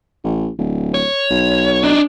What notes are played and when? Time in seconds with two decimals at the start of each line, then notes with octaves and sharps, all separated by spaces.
0.24 A1
0.59 D1
0.94 C#5
1.30 B1
1.83 D4 D#4